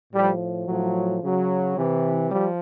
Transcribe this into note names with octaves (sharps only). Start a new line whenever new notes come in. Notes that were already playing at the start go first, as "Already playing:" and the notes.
A2 F3 G3
A2 F3 F#3
C#3 F#3
C3 E3
F3 G3